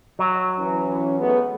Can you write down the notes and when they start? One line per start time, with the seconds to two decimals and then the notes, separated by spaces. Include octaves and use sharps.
0.19 F#3
0.59 E3 C#4
1.20 G#3 A3 B3